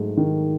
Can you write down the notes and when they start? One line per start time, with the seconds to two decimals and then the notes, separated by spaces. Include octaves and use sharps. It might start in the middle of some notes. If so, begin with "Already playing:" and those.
Already playing: G#2 F#3 A3
0.17 D#3